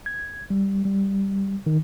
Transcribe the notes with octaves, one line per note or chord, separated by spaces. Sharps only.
G#6
G3
G3
D#3